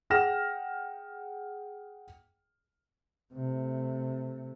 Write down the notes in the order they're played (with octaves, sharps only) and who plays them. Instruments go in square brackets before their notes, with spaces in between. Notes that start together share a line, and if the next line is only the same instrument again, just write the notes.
[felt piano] G#4 F#5 G5 F6 A#6 E7
[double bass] C3 A3